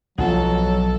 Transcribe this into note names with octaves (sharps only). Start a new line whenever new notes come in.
B1 F3 F#3 A4 F#5